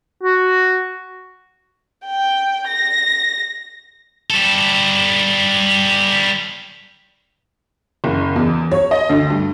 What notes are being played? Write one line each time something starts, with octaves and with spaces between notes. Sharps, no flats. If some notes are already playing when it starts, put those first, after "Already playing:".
F#4
G5
A#6
G3 A4
F#1
E2
C#5
D#5
D2
G2